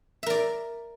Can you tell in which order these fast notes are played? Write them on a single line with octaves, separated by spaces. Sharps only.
E5 A#4 D5